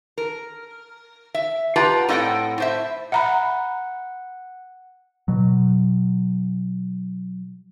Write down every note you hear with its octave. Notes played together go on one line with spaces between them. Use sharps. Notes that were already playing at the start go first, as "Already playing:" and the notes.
A#4
E5
F4 G4 B4 F#5 A5 A#5
A2 C4 D#5 E5 F#5 G5
A2 C5 E5
E5 F#5 A#5 B5
B2 F#3